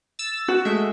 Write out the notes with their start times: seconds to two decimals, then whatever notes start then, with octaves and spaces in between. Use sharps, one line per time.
0.19 E6 A6
0.48 F#4
0.65 G#3 A3 E5